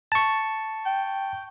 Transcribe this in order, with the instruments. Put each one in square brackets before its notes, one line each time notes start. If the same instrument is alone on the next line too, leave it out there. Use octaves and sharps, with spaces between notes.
[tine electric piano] A5 C#6
[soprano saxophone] G5